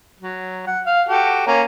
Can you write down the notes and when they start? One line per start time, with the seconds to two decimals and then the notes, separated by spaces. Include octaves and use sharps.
0.20 F#3
0.67 F#5
0.86 F5
1.09 F#4 G4 A4
1.47 A#3 C#4